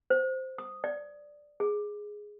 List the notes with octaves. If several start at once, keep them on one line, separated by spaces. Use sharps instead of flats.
C5
D#6
D5
G#4